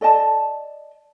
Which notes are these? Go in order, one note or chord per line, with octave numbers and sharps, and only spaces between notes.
A4 D5 D#5 A5